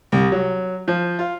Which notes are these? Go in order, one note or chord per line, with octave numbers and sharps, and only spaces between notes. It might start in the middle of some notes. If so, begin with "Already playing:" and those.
C2
F#3
F3
F4